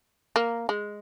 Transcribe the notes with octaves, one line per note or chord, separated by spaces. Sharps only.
A#3
G#3